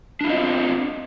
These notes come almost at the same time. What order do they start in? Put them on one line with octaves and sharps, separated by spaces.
D4 E4 F4 D#5 C4